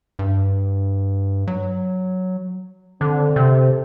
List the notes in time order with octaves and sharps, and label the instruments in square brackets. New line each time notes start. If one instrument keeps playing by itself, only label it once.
[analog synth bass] G2
F#3
[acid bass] D3 [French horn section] C4 A4
[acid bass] C3